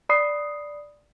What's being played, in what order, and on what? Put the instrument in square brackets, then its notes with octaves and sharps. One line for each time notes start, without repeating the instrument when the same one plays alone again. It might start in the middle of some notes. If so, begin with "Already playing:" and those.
[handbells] D5 B5 D#6 C7